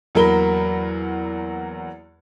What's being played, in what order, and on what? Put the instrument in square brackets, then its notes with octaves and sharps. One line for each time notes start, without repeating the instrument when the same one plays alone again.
[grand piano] E2 F#3 A#3 A#4 B5 G7